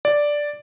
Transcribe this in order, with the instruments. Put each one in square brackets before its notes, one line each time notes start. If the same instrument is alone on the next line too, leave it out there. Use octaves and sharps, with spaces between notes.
[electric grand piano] D5